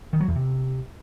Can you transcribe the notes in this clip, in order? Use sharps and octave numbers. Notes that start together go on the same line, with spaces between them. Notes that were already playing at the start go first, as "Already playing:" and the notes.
D#3
F#3
E2
C3